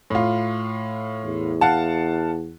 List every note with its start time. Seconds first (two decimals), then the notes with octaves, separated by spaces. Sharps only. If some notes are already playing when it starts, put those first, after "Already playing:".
0.10 A2 F4
1.25 E2
1.61 F5 F#5 A5